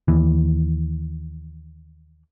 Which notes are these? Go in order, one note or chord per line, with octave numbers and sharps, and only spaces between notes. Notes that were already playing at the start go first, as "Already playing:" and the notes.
D#2 E3